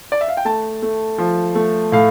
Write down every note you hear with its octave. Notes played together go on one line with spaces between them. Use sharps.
D5
E5
F5
G5
A3 A5
A3
F3
A3
A2 F5